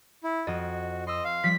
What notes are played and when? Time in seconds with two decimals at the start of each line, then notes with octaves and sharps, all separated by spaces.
0.24 E4
0.47 F2 F#4 A4 D#5
1.07 D#5 C6 E6
1.24 F5
1.43 F3 G3 B6